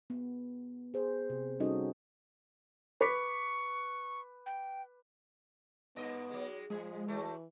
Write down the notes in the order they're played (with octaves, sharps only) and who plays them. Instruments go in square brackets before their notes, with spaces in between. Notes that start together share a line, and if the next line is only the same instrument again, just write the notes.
[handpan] B3
G#4 C5
C3
G3 C#4 D#4 F#4 A4 D#5
[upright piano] B4 D6 B6 [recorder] C#6
[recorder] G5
[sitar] G2 D#5 [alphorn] B3
[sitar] F#3 G#3
[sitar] A2 G#4 [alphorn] F3 [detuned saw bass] G#3
[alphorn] E3 [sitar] F#3 A3